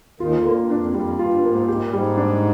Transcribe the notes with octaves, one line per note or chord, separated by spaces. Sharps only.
D#2 D#3 F4
D2 D3
A#3
G#2
G2
D4
F2
F2 G3
G2 F4
G#2 A#3
G#2 G4
A#2
G#2 G3
D4